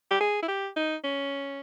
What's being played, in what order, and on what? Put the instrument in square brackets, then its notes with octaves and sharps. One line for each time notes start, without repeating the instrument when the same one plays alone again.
[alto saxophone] G4
G#4
E4
G4
D#4
C#4